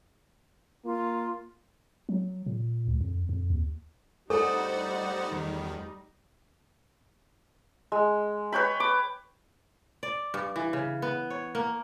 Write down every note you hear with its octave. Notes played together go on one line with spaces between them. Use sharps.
A#3 F4
F#3
A#2
C#2
F2
F2
D#2
G2 G3 A3 D#4 A4 C5 D5 F#5
E2 D#3
G#3
B4 C#5 G5 B5
D6
D5
G2
E3
C#3
B3
C#5
A#3